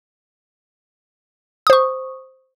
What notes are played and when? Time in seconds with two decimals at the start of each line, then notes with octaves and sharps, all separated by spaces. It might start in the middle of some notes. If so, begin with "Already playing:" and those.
1.67 D#6
1.70 C5
1.73 C#6